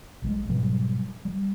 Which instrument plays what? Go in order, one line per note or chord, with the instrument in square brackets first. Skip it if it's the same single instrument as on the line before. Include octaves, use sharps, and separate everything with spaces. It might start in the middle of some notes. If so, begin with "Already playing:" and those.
[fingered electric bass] A#1 F3 G#3
G#2 B2 F#3 G3
G3